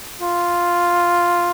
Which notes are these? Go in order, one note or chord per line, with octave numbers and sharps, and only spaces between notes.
F4